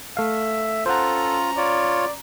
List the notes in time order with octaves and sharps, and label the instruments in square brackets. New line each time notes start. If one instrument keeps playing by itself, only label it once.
[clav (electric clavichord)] A3 F5 [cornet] E5
[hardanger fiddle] C#4 A#5 [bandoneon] F4 [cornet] A4 [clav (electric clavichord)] C5 F#5
[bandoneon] F4 C#5 [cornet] D5